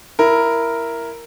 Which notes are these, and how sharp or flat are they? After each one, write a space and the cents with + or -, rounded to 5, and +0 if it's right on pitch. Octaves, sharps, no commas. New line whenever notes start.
E4 +10 A#4 +0